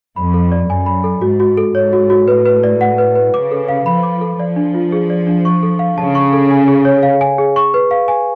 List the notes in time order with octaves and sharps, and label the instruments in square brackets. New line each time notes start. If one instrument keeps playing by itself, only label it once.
[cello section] F2 [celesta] B5
[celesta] A4
D5
[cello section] F#2 [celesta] G#5
[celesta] B5
A4
[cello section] G#2 [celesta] F#4
[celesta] F#4
A4
[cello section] G#2 [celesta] C#5
[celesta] F#4
F#4
[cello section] A2 [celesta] B4
[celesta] B4
D5
F#5
B4
B4
[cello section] C#3 [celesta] D6
[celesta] A4
F5
[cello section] F3 [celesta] B5
[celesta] D6
A4
[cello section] F3 [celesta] D5
[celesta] D4
F4
G#4
D5
D4
C#6
A4
F5
[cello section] C#3 [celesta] A5
[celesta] C#6
A4
G#5
G#4
C#5
F5
G#5
G#4
C#6
B4
F5
G#5